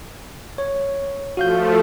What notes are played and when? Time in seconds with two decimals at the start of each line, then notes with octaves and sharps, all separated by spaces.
0.58 C#5
1.37 F3 A3 F#4 F5 G6